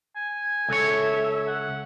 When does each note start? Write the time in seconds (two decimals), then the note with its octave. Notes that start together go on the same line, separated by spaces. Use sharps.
0.16 G#5
0.69 C#2 A4 C#5 E5
1.47 F#5